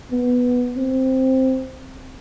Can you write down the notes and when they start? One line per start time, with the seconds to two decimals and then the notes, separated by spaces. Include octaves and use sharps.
0.11 B3
0.76 C4